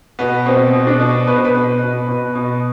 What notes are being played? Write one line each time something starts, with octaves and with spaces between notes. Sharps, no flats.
B2 B3
B2 C4
B2
D4
B2
B2 B4
C5
B4
B2
B2
B2
B2